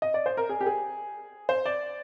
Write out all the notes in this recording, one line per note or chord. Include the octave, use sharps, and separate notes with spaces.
D#5
D5
C5
A#4
G#4
G4
G#4
C5
D5